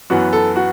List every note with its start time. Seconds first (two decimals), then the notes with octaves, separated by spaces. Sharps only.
0.10 F#2 E3 B3 F#4
0.33 A4
0.56 F#4